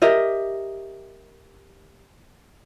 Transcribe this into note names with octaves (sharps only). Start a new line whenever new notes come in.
G4 A#4 D#5 E5